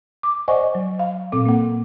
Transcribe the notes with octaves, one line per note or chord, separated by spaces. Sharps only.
D6
C5 D5 D#5 F#5 G#5 C#6
F#3
F5
A#2 C4 A4 D6
A#3 F#5